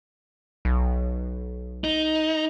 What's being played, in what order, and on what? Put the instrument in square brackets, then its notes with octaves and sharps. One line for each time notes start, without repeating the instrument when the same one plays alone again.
[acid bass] B1
[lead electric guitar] D#4